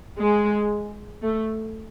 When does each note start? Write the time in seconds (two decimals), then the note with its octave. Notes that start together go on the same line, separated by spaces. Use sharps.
0.19 G#3
1.22 A3